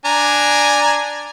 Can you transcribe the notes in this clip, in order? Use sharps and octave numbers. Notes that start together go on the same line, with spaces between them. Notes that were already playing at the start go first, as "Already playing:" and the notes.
D4 G#5 A#5